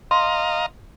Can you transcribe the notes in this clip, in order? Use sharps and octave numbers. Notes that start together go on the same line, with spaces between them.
D#5 F5 A#5 C6